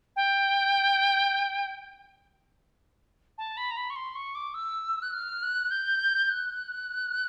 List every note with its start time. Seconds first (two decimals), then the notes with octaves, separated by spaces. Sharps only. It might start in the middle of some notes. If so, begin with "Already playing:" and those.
0.16 G5
3.38 A5
3.57 B5
3.71 A#5
3.77 B5
3.90 C#6
3.96 C6
4.15 C#6
4.35 D6
4.54 E6
5.02 F#6
5.13 F6
5.42 F#6
5.71 G6
6.30 F#6